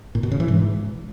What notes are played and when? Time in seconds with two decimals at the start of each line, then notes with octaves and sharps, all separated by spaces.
0.15 A#2
0.23 B2
0.32 C#3
0.40 E3
0.48 G#2